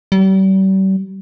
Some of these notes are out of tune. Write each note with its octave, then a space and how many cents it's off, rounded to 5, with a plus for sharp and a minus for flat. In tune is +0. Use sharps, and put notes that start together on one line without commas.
G3 -40